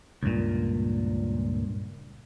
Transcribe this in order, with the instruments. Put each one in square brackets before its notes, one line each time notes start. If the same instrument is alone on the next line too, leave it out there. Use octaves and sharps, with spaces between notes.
[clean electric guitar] C#2 G2 A#2